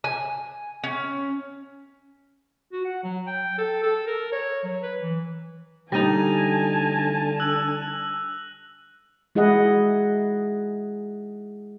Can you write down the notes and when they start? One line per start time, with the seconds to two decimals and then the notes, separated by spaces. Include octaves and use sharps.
0.04 G#5
0.84 C#4
2.72 F#4
2.85 F#5
3.03 F#3
3.27 G5
3.58 A4
3.83 A4
4.07 A#4
4.32 C#5
4.64 F#3
4.83 B4
5.01 E3
5.92 D3 G3 D#4 G#5 A5 A#6 D#7 F7
7.40 E6 F#6 F#7
9.35 G#3 E4 G#4 D#5 F#5